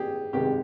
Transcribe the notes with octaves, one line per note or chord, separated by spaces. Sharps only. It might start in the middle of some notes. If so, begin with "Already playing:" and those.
Already playing: G4 G#4
C2 C3 D#3 G#3 G4